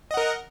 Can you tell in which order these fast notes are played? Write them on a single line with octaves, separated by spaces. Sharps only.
D#5 F#5 A#4